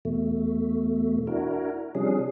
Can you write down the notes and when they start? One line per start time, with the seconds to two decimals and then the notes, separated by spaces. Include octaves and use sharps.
0.05 E2 B2 A3
1.27 D4 E4 F#4 A#4
1.95 C3 F3 G3 C#4 D4 G#4